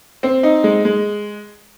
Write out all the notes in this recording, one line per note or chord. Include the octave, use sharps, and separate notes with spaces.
C4
D#4
G#3
G#3